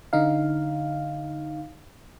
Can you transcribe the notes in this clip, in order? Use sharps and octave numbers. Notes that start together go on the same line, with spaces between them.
D3 D#4 F5